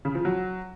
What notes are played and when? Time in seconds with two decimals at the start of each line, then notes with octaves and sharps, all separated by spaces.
0.05 C#3
0.15 F3
0.25 F#3